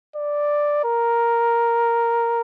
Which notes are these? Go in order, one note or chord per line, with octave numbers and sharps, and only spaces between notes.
D5
A#4